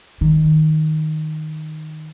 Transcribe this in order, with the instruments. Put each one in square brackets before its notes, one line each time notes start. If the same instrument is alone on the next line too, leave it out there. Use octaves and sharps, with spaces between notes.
[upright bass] D#3